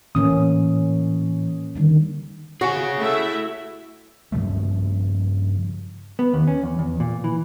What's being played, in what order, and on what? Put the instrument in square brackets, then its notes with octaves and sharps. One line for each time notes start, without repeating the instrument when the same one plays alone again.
[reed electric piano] A2 E3 D#6 [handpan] A#3 C#4
[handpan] D3 D#3 G3
[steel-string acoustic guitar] F#4 [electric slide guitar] G#4 C#5 G#5
[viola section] A3 E4 E5
[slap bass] G2 C#3 F3 A3
[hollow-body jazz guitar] B3
D#2
C#4
E2
E2
A#2
E3